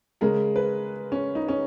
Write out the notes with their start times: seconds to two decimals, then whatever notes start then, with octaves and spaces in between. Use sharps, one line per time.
0.21 C#3 G#3 A#4
0.56 B4
1.12 C#4
1.35 D#4
1.48 C#4